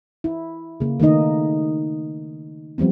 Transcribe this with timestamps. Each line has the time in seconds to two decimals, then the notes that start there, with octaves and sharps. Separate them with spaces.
0.24 E4
0.80 C#3 A#3
1.00 D#3 A3 A#3 D#4 D#5
2.78 F3 G3 B3 C4